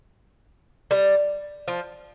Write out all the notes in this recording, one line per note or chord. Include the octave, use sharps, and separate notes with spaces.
G3
F3